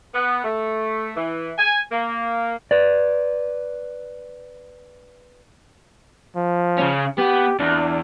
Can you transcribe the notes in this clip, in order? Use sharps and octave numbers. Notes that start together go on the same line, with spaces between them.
B3
A3
E3
G#5
A#3
B4 D5
F3
C#3 C#4
B3 G4
E2 D4